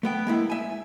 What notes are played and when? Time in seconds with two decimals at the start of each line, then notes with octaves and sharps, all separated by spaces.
0.03 A3 B3 G5
0.27 G#3 A#3 E4
0.50 E5 G#5